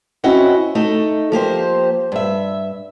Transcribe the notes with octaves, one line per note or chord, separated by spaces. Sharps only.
C4 C#4 E4 F#4 D#5 F#5
A3 D#4 A4
F3 A#3 G4 C5
G2 E5